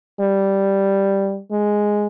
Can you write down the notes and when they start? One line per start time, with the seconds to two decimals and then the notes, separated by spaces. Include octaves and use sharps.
0.21 G3
1.52 G#3